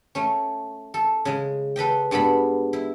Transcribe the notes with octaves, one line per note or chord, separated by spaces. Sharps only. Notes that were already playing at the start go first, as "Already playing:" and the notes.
A3 C#4
A4
C#3 G#3
A4 B4 D#5 G5
G2 G#3 B3 A4 B5
E4